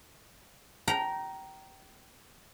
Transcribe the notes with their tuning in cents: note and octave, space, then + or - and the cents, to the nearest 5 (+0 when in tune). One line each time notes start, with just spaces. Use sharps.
G5 -25 A#5 +10